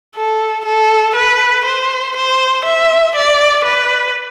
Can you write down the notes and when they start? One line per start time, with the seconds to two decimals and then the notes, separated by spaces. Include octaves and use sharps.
0.15 A4
0.65 A4
1.15 B4
1.65 C5
2.16 C5
2.65 E5
3.15 D5
3.65 B4